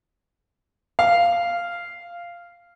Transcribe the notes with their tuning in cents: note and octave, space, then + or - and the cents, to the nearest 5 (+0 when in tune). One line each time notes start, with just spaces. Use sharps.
F5 -10